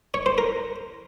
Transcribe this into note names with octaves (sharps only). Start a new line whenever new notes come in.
C#5
C5
A#4